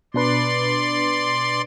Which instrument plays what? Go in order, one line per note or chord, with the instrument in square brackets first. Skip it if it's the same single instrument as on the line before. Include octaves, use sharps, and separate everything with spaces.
[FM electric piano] B2 D4 B4 [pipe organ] D5 C6